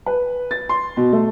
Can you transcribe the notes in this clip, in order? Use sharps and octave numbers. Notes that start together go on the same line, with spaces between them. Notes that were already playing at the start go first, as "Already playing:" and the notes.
B4
A6
C6
B2
A3